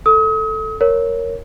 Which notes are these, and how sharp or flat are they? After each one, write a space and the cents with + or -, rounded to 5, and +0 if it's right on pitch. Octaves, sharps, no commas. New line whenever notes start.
A4 +0 D#6 +40
A#4 +0 C#5 +0